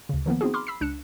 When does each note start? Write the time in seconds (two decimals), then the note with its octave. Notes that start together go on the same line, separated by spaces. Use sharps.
0.09 D2 C#3
0.26 D#3 F3 A#3 B3
0.41 B3 C4 D#4 F4 F#4 G#4
0.54 B5 C6 D6 F6
0.67 B5 E6 B6 C7
0.81 C#2 D4 F#6 C#7 E7